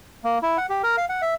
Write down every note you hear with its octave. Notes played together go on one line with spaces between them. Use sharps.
A#3
E4
F#5
G4
A#4
F5
F#5
E5